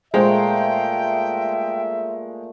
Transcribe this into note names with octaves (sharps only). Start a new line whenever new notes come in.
A#2 G#3 A3 C5 E5 G5 A#5